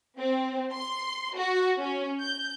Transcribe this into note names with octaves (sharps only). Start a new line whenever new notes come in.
C4
C6
F#4
C#4
G6